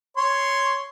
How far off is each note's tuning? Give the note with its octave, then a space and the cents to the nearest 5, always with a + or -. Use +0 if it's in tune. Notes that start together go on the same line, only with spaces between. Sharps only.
C#5 +0 C6 +0